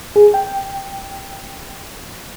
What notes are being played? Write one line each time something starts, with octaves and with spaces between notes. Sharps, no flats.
G#4
G5